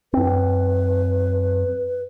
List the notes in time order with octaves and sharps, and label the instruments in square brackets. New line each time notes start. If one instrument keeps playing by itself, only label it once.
[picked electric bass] F#2 C4 [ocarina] B4